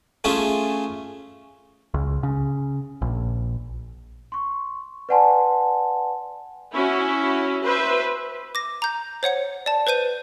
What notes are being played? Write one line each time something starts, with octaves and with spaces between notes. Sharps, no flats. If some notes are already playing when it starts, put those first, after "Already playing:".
A3 C#4 F4 G#4 E5
C#2
C#3
A#1
C6 C#6
B4 D5 F#5 G#5 A5 C6
C#4 E4 F#4
B4 C5 E5
D6 A#6
A#5 G6
C5 C#5 F#5 C#7
D5 A5
B4 C5 G6 D#7